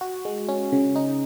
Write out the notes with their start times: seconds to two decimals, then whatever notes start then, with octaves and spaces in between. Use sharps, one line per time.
0.01 F#4
0.25 G#3
0.49 C#4
0.72 C#3
0.96 D#4